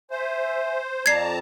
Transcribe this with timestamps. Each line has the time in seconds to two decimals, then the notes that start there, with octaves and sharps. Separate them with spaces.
0.11 C5 E5 G#5
1.06 F2 D5 A5 A#5 G#6 C7